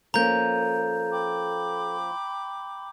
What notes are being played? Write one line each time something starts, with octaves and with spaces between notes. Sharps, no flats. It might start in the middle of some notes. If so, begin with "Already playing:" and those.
F3 A#3 C#4 A4 A#5 G6
G5 B5 D6